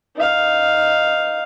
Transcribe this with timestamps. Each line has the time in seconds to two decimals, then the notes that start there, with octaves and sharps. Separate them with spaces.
0.16 D#4 F5